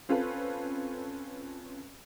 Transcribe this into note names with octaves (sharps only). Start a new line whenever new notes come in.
C4 C#4 F4 A4 B4